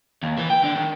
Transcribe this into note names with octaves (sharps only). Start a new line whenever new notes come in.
D#2
E3
G5
D3
D#3